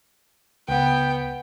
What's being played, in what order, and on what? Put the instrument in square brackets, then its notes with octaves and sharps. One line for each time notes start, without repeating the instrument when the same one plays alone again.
[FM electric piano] C#2 [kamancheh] B3 G5